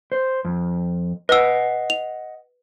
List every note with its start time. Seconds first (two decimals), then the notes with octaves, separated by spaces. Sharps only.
0.12 C5
0.45 F2
1.29 B4 D#5 F#5 E6
1.90 F7